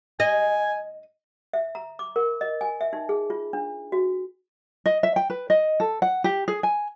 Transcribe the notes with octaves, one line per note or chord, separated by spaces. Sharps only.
D#5 G#5
E5
A#5
D6
A#4
D#5
G#5
E5
D#4
G#4
F4
D4
F#4
D#5
E5
G5
B4
D#5
A4
F#5
G4
G#4
G#5